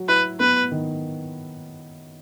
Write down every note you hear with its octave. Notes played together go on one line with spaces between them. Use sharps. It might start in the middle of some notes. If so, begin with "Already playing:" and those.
Already playing: F#3
E4 B4
B3 B4
D#3